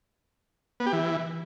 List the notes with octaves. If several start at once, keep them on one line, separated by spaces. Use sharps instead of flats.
B3
G4
E3